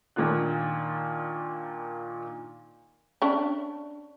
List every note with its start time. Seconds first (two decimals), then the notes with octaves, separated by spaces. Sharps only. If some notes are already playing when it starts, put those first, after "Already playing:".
0.16 A#2 D#3 A#3 D4 F4 F#6
3.22 C#4 D4